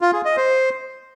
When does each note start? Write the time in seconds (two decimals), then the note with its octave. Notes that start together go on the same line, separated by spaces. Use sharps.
0.01 F4
0.13 G#4
0.25 D#5
0.37 C5